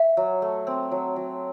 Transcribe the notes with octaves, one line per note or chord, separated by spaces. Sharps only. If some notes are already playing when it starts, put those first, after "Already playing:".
Already playing: E5
F#3
A3
C4
F#3
F#3